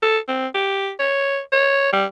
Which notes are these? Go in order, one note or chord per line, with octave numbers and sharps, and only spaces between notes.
A4
C4
G4
C#5
C#5
G3